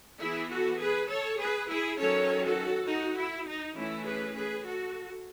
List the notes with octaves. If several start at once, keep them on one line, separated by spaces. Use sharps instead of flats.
E3 B3 E4 G#4
F#4 A4
G#4 B4
A4 C#5
G#4 B4
E4 G#4
D#3 F#3 C#4 A4 C#5
F#4 A4
D#4 F#4
E4
D#4
E3 A3 C#4 E4
G#4 B4
G#4 B4
F#4 A4